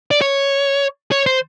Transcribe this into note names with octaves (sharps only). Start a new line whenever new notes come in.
D5
C#5
C#5
C5